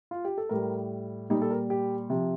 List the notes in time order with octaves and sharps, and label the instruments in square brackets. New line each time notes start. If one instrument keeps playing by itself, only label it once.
[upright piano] F4
G4
A4
A2 G3 A#4
A#2 G3 D#4
A4
A#4
G4
C3 F3